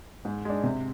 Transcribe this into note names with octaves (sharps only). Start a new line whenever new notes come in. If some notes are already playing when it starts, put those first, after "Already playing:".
G#2
G#3 D4
C3